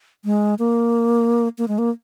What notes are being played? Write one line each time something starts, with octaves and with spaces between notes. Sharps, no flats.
G#3
A#3
A#3
G#3
A#3